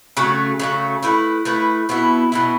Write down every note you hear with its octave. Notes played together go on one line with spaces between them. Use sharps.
C#3 F#3 A3
C#3 F#3 A3
A3 E4 B4
A3 E4 B4
B2 B3 E4
B2 B3 E4